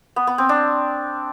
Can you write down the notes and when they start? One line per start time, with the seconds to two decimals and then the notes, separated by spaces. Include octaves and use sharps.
0.16 B3
0.27 B3
0.38 C4
0.49 D4